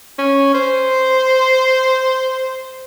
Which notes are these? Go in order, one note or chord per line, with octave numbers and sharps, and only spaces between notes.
C#4
C5